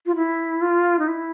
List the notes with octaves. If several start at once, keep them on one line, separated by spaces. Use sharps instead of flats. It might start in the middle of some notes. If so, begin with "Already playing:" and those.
F4
E4
F4
D#4
E4